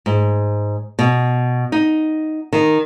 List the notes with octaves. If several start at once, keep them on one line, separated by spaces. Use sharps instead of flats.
G#2
B2
D#4
D#3